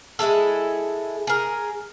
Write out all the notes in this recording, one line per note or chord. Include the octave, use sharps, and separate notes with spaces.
G#3 E4 G#4 A4
G#4 A#4